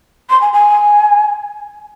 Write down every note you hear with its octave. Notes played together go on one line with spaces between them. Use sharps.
C6
G#5
G#5